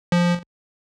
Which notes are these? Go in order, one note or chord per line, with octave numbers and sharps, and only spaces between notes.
F3